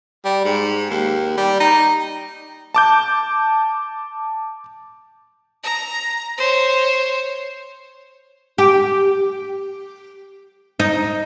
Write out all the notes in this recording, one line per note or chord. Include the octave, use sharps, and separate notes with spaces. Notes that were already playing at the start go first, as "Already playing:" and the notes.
G3
G#2
D#2
G3
D#4
A5 D6 G6
A#5
C5 C#5
G4
D#4